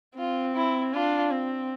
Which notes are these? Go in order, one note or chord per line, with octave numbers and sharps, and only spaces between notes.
C4 F4
E4
D4 F4
C4